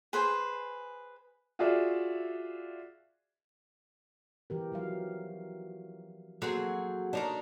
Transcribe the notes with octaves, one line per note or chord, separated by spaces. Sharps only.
G#4 B4 C5 G#5
F4 F#4 G#4 D5 E5 F5
E3 G4 A#4
F3 F#3 F5
F#3 A#3 C4 F#4 G#4 A4
D4 D#4 A#4 C#5 D#5